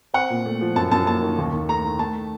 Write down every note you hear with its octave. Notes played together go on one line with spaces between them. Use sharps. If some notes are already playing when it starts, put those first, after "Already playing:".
C4 F#5
A#2
A3
F3
F#2 A5
F#2 A5
A#3 A5
D#3
D#2
D#2
A3 A#5
D#3
A3 A5